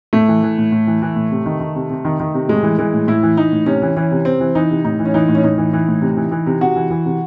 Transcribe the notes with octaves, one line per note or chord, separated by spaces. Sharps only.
A2 A3
E3
E3
A2
A2
E3
E3
A2
C3
D#3
D#3
C3
C3
D#3
D#3
C3
A2 G#3
E3
E3 G#3
A2
A2 E4
E3
E3 D#4
A2
C3 C#4
E3
E3 C#4
C3
C3 C4
E3
E3 D#4
C3
A2 D#4
E3
C#4
E3 D#4
A2
C#4
A2 D#4
E3
E3
A2
C3
E3
E3
C3
C3 F#4
E3
E3
C3